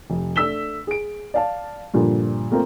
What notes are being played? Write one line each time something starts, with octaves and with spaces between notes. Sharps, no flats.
F1
A3 D4 E6 B6 E7 G7
G#4 D7
D5 F5 A5
G2 A#2 D3 F3
A3 A#3 C4 F4 A#4